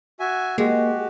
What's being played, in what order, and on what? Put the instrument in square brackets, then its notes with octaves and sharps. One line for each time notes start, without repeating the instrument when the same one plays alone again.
[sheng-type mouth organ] F#4 E5 G#5
[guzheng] G#3 [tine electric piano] A#3 [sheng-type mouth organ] F#4 G4